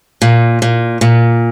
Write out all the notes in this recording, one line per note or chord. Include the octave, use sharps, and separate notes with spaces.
A#2
A#2
A#2